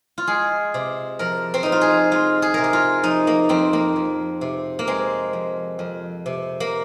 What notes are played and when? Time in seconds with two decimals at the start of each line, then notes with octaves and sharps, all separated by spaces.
0.18 F4
0.27 G#3 G#4
0.74 C3
1.19 F3 A#4
1.54 C4
1.63 F2 D#4
1.72 F4
1.81 G#4
2.11 G#3 F4
2.42 G#4
2.54 C3 A#4
2.64 G#4
2.73 F4
3.03 F3 D#4
3.27 A#3
3.49 F2 C4
3.73 A#3
3.96 F2
4.41 C3
4.79 A#3
4.87 G#3 C4
5.33 F2
5.79 F2
6.26 C3
6.60 A#3